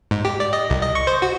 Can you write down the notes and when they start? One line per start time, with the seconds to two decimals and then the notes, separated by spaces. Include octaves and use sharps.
0.11 G#2
0.25 G4
0.40 D5
0.53 D#5
0.70 C2
0.81 D#5
0.95 C#6
1.07 C5
1.22 F#4